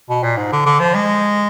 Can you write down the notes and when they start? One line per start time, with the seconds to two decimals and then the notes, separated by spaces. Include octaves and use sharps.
0.10 B2
0.23 A#2
0.37 G#2
0.52 D3
0.66 D3
0.80 F3
0.95 G#3